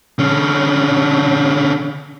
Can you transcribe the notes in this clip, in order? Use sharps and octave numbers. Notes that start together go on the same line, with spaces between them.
D3 C#4